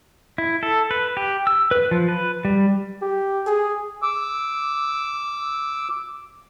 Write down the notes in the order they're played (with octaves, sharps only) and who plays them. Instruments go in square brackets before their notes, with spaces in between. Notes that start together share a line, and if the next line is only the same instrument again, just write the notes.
[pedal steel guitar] E4
A4
B4
G4
E6
B4
F3
B4
G3
[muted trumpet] G4
G#4
[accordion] D6 E6